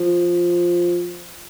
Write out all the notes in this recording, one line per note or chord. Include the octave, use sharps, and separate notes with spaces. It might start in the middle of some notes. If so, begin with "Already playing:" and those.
Already playing: F3